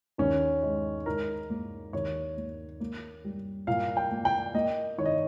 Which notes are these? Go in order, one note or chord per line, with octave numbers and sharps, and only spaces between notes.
D#2 C#4
G#3
G#2 A#4
A#3
D#2 C#5
A#3
A#3
G3
A#2 F5
G5
A#3
G5
A#3 D#5
D#3 C#5
D#5